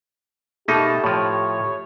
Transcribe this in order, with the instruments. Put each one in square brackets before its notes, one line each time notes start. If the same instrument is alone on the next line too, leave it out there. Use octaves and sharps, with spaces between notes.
[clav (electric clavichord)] B2 A#3 D#4 [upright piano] A3 [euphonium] G4 [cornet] A5
[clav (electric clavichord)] A2 F3 [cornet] C#5